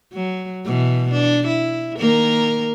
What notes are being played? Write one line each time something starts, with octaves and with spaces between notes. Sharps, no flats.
F#3
B2 E3
D4
E4
D#3 A#3 A#4